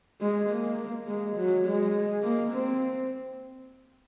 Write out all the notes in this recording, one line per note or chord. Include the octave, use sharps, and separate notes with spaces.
G#3
A#3
G#3
F#3
G#3
A#3
C4